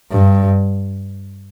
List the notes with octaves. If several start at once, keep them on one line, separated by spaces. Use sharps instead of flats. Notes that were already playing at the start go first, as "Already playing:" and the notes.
G2